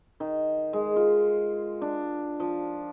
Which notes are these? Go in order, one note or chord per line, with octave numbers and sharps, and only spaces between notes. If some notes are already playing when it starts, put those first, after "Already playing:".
D#3
G#3
F4
D4
F3